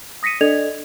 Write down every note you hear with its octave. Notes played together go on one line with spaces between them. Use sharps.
D#6 A#6 B6 C#7 D#7
D4 A4 D5 D#5 G#6 F7